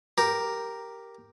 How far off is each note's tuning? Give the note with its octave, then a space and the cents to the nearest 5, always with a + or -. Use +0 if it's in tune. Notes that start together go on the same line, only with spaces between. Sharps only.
G4 +0 A#4 +0